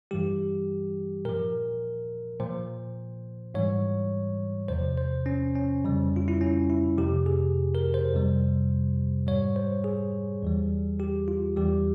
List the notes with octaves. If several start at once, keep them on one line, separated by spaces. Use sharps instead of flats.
G2 E3 G3 G4
A#2 F3 A#4
A#2 F3 C5
G#2 E3 G3 C#5
E2 C3 F3 C5
C5
C#4
C#4
F2 C#3 G3
F4
E4
C#4
E4
F2 C3 F3 G4
G#4
A#4
C5
F2 C3 G3
G#2 G3 C#5
C5
G#4
E2 E3 G3
G4
F4
E2 E3 G3 G4